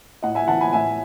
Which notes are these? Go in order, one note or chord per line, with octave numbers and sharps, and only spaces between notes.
A2 D#5 F#5
E5 G#5
E3 F#5 A5
G#5 B5
A2 E5 G#5